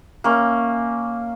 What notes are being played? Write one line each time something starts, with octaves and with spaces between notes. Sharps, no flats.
A#3 C#4 E5